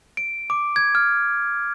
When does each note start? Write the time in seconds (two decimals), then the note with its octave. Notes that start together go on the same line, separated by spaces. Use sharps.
0.17 D7
0.50 D6
0.76 G#6
0.95 F6